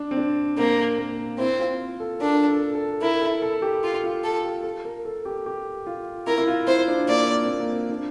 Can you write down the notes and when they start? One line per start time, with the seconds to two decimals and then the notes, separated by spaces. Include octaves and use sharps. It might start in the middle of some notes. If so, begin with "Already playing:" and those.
Already playing: D4
0.11 C4
0.17 D4
0.58 A#3 C4
0.99 A#3
1.39 C4 E4
1.59 F4
2.00 A4
2.20 D4 A#4
2.48 A4
2.75 A4
3.02 E4 A#4
3.21 A4
3.42 A4
3.62 G4
3.83 F4
4.04 F4
4.24 A4
4.44 G4
4.64 A4
4.85 A#4
5.05 A4
5.25 G4
5.46 G4
5.87 F4
6.27 E4 A#4
6.38 E4
6.47 F4
6.67 E4 C5
6.88 D4
7.08 A#3 D5
7.28 A#3
7.43 C4
7.49 A#3
7.60 A#3
7.69 C4
7.90 D4